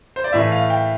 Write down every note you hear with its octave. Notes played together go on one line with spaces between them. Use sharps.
C5
D5
A2 E3 A3 E5
F5
G5